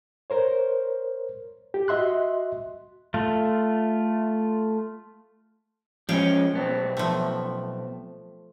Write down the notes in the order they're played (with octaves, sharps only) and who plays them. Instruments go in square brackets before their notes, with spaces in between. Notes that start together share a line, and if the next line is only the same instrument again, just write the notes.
[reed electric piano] A#4 C5 C#5
G4
F#4 D#5 E5 C6 F#6
[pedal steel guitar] A3 F4
[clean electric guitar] F3 G#3 C#4 [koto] G#4 F5 G5
[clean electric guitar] B1 B3 C4
[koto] F3 A3